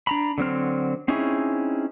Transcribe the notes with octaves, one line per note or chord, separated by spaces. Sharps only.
D4 A#5 B5
D3 F#3 C4 F6
C4 C#4 D#4 E4 G#4